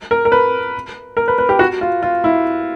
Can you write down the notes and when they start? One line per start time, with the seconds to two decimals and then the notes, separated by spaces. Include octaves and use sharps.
0.11 A#4
0.25 A#4
0.32 B4
1.17 A#4
1.28 B4
1.38 B4
1.49 G4
1.59 F#4
1.81 F4
2.03 F4
2.24 E4